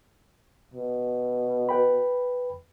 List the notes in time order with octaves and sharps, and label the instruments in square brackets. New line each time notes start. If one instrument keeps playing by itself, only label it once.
[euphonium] B2
[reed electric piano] B4 G5 B5